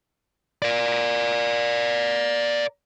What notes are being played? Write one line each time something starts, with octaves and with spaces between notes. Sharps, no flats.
A#4 D5